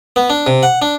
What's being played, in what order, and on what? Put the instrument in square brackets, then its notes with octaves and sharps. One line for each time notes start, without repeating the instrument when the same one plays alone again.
[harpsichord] B3
D4
C3
F#5
D4